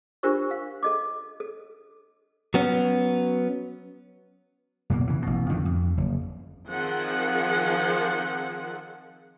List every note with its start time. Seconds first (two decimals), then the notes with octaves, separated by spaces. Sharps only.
0.23 D4 F4 G4 A#4 C5 C#6
0.51 F5
0.83 A4 D#5 D6
1.40 A4
2.54 F#3 B3 C#4
4.90 F#2 B2 A#3
5.07 C#3 E3
5.22 A1 B2
5.49 F2 D3 D#3
5.65 F2
5.97 F#1
6.68 D#3 F3 C4 G#4 F#5